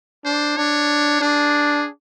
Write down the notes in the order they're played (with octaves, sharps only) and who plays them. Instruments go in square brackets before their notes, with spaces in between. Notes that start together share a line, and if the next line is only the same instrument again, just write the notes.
[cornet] D4 [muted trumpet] C5
[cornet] D4 [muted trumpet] C#5
[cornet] D4 [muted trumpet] G#4